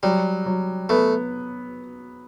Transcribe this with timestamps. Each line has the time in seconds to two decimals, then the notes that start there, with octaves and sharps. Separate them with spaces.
0.03 F#3 G3
0.46 F#3
0.89 A3 B3